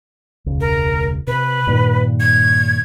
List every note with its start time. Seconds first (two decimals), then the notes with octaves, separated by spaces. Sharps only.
0.46 E1 C#2
0.61 A#4
1.27 C3 B4
1.67 G2 A#2 D#3
2.20 G#6